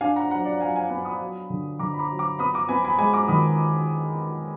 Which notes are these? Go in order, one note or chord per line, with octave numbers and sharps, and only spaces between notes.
D4 F5 G#5
F#5 A#5
F#3 F#5 A#5
D5
F#3 F5 G#5
F5 G#5
B3 G#5 B5
B5 D#6
F#3
D3
D3 A#5 D6
B5
A#5 D6
F#3
A#5 D6
B3 B5 D#6
A#5 D6
B3 G#5 B5
G#5 B5
G#3 G#5 B5
A#5 D6
D#3 B5 D#6